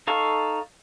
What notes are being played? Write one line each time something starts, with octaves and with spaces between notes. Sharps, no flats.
D#4 A4 F5 C#6